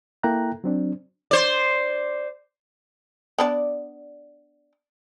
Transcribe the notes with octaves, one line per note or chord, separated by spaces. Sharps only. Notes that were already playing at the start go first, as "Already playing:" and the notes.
A#3 E4 A4 G5 A#5 F#6
F#3 C4 D4
C5 D5
B3 D4 D5